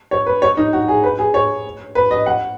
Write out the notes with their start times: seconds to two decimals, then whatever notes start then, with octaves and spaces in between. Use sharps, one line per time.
0.11 C#5
0.26 B4
0.42 C#5
0.57 D#4
0.73 F#4
0.88 G#4
1.03 B4
1.19 G#4
1.34 C#5
1.95 B4
2.11 D#5
2.26 F#5